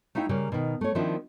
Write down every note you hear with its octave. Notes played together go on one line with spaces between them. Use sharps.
A3 D#4 E4 F5 G5
C#3 G3 A#3
B2 D#3
A3 C#5
D#3 F3 A#3 C4 D4 E4